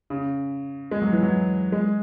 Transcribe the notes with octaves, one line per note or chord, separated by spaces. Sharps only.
C#3
G#3
F#3
E3
F#3
G#3